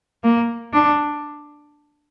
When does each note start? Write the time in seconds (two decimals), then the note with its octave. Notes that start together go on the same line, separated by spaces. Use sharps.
0.24 A#3
0.73 D4